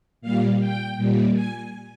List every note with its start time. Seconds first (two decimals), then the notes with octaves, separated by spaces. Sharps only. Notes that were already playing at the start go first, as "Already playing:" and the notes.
0.21 A#2 G3 F5
0.59 G5
0.97 A#2 G3
1.34 G#5